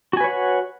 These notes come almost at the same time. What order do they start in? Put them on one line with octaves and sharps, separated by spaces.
F#4 G#5 B4 C#5 F#5